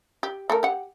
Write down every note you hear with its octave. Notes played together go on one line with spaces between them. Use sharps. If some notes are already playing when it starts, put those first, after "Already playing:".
G4
A3 A4 A#4
G4 F#5